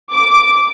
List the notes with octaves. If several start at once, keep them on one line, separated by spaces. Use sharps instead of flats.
D6